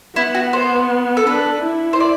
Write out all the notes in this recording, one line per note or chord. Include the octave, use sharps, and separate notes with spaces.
B3 E4
F#4
C5
A4
D4 B4
E4
C5
D5